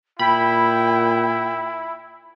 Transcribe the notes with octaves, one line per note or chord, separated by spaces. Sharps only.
A#2 E4 G5 B5